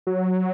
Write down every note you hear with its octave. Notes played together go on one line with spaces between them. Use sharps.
F#3